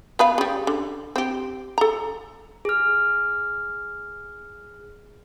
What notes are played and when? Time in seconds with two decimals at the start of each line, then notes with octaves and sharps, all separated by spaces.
0.19 B3 B4 F5
0.38 C#3 G3
0.67 D3
1.16 C4 G4
1.78 A4 A#5
2.65 G#4 F6